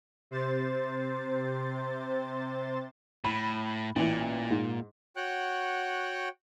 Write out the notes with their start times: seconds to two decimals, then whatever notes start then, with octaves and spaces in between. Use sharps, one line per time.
0.31 C3 C5 A6
3.24 A2 B5
3.96 A1 A#2 E3
4.51 G#2
5.16 F#4 C#5 F#5 G5 F#6